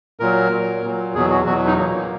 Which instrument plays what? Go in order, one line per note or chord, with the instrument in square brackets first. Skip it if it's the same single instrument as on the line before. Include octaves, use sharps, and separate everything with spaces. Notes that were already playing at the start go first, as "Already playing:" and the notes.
[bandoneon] A#2 F#3 A#4
A#2 F#3
A#2 F#3
E2 B2 F#3 G#4
F#4
E2 B2 F#3 F#4
D#4
A#2 F#3 A#3